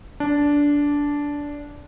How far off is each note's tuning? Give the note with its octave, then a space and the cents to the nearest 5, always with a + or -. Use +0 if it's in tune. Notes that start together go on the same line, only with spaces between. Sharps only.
D4 -15